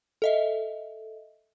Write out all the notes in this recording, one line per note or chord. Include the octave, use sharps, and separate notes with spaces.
A4 D#5 E5